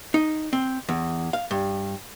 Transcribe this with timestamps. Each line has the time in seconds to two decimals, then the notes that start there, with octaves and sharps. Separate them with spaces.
0.14 D#4
0.53 C4
0.89 E2
1.33 F5
1.51 G2